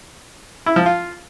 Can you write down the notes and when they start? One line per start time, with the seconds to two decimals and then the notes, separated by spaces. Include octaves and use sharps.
0.66 E4
0.76 F3
0.86 F4